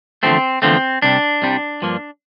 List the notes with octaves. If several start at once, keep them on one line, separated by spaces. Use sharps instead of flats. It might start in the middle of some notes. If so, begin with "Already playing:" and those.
E2 D3 F3 A3 C4
E2 D3 F3 A3 C4
C2 C3 G3 D4
C2 C3 G3
G2 F3 A#3